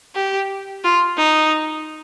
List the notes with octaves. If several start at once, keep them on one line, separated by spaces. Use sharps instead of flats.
G4
F4
D#4